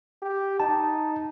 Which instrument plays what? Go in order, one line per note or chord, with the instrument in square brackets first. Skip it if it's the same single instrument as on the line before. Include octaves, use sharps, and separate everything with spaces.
[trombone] G4
[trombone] D#4 [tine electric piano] A5